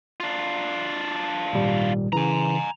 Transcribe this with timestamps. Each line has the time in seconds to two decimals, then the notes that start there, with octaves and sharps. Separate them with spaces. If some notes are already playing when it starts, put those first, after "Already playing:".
0.20 D4 F4
1.53 G#1 A#2 G3
2.13 C#3 E3 G#5 A#5